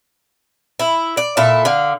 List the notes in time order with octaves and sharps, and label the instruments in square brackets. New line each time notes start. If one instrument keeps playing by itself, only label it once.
[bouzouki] E4
D5
A#2 E4 A4
D3 F5